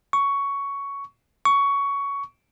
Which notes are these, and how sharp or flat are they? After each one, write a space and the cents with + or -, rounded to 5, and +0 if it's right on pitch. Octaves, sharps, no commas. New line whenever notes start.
C#6 +10
C#6 +15